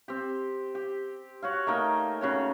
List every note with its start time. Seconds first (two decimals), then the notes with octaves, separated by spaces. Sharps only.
0.08 C4 G4
0.75 G4
1.42 F#4 C#5 F5
1.67 A3 A#3 D#4 G5
2.21 C#3 F#4 C#5